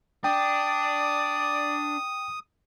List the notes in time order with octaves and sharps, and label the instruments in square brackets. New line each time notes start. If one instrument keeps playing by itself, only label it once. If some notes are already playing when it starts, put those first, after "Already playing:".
[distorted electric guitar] D4 [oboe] D5 [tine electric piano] G5 [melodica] D#6